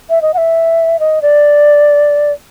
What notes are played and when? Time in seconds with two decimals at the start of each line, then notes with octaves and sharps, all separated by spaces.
0.10 E5
0.22 D#5
0.34 F#5
0.38 E5
1.00 D#5
1.22 D5